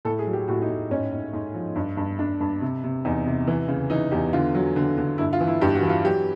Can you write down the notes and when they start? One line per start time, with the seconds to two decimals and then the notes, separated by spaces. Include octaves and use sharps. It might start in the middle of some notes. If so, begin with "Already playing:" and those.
0.05 A2 A4
0.19 G#4
0.27 F#3
0.33 G4
0.48 A2 F#4
0.62 D#4
0.69 A2
0.91 G#2 C#4
1.12 G#2
1.33 G#2
1.54 F3
1.76 G2
1.97 G2
2.19 G2 D4
2.40 G2
2.61 C3
2.84 C3
3.05 E2 D#4
3.27 C3
3.47 E3
3.68 C#3
3.90 E3 D#4
4.11 E2 G4
4.33 D3 F4
4.55 F#3
4.76 D3
4.98 D3
5.18 G2 E4
5.33 F4
5.40 E3
5.47 E4
5.61 G2 G4
5.75 F#4
5.82 E3
5.89 F4
6.05 F#3 G4